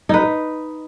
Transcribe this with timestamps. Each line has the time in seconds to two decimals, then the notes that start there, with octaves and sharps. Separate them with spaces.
0.09 D#4 B4